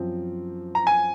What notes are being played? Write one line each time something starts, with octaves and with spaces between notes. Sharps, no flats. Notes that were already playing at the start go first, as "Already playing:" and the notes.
Already playing: F#2 F3 C4
A#5
G#5